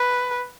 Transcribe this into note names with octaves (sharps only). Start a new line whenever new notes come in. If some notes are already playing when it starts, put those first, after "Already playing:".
Already playing: B4